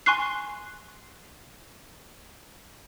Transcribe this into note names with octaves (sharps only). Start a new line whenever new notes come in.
G#5 C6 C#6 F#6 C7